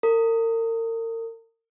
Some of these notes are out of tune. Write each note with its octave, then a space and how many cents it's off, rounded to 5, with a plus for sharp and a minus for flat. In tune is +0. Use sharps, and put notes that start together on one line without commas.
A#4 -40